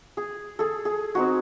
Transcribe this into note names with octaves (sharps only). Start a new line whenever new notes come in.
G#4
G#4 A4
G#4
C4 D#4 F#4